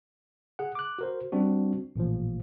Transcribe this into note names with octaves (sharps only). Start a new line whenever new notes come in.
G#4 F#5
D6 F#6
F#4 A#4 C5
G3 C4 D4 F#4
A1 A#2 F3